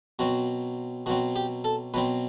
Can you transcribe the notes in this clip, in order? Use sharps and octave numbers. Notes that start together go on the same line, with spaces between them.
B2 F#3 C4 F#4
B2 F#3 C4 F#4
G4
A4
B2 F#3 C4 B4